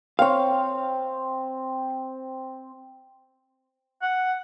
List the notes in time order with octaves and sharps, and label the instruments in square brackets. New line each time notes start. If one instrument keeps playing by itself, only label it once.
[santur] C4 [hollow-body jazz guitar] C#5 F5
[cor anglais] F#5